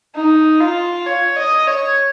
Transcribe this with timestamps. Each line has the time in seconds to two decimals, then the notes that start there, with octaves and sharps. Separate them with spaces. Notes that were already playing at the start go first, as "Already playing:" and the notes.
0.15 D#4
0.60 F4
1.06 C#5
1.37 D#5
1.67 C#5